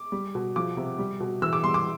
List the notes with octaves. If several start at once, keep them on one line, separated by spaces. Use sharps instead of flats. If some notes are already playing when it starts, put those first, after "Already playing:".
Already playing: D6
G3
B2
F3 D6
C3
G3
B2
E3 E6
D6
G3 C6
D6